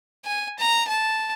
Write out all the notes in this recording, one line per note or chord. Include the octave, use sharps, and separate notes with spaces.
G#5
A#5
A5